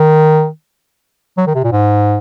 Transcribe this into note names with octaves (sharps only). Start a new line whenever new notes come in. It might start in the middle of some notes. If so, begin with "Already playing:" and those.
Already playing: D#3
F#3
D#3
C3
A#2
G#2